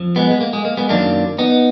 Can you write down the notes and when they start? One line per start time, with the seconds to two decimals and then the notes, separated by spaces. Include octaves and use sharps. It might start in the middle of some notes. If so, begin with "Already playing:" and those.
Already playing: F2 F3
0.16 G#3 B3
0.30 G#3
0.41 A#3
0.53 G#3
0.65 A#3
0.77 G#3 B3
0.89 F#2 D#3 F#3 A#3 D4
1.38 B3 D#4